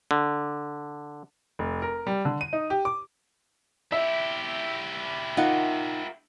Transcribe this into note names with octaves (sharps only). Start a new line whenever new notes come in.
D3
F1
A#4
G3
D3
D#7
D#4
G4
D6
E4 G4 E5
D#4 F4 A#4 F#5